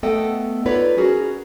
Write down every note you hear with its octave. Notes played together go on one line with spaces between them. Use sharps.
A3 B3 A4 D#5 F#5 G5
D#4 F4 A4 B4 C#5 D5
C#4 F#4 G#4 A#4